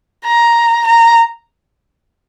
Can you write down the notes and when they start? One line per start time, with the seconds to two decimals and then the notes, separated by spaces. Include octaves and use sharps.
0.25 A#5
0.87 A#5